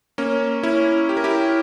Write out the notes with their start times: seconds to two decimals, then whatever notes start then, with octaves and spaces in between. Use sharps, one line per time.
0.18 A#3 C#4
0.63 C#4 E4
1.09 G4
1.17 A#4
1.24 E4 G4